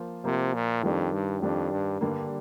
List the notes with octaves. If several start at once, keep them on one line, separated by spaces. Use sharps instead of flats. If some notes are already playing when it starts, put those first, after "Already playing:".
Already playing: F3 A#3 F4 C5
C3 F3 A#3 F4 C5
A#2
F2 D#3 G3 D4
G2
F2 D#3 G3 D4
G2
G2 D3 G3 A#3